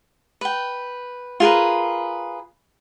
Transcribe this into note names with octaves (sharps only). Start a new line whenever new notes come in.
B4 G5
F4 G#4 A#4 B4